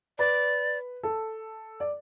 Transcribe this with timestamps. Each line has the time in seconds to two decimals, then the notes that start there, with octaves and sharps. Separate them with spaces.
0.19 B4 D5
1.03 A4
1.80 D5